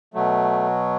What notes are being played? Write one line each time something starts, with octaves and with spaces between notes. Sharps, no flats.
B2 F#3 A3